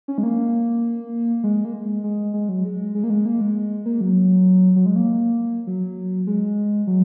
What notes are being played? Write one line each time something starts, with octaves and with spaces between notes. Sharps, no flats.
C#4
G#3
A#3
G#3
A#3
G#3
G#3
G#3
F#3
G#3
G#3
A#3
G#3
A#3
G#3
A#3
F#3
F#3
G#3
A#3
F#3
G#3
F#3